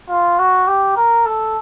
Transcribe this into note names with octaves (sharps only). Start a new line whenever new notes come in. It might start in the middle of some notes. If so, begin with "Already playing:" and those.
F4
F#4
G4
A#4
A4